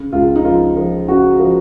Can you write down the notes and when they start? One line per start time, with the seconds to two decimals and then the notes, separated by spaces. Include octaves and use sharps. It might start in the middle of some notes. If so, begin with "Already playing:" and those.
Already playing: C#3
0.12 C#2 F4
0.36 D#4
0.45 F3 F4
0.77 F3
1.08 C#3 F#4
1.40 F3